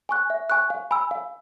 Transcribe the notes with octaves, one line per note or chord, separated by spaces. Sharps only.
G#5 C#6 F#6
E5
G#5 C#6 F#6
F5
G#5 B5 E6
F5